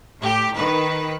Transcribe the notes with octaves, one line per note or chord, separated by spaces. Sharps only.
A2 G4
D#3 B4